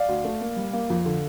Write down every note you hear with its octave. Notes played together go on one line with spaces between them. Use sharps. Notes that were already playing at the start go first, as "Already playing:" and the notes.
Already playing: D5 F5
D2
A3
A#3
G3
A#3
F2
D3